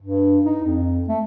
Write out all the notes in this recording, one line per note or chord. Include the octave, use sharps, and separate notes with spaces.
G2
D#4
F2
A3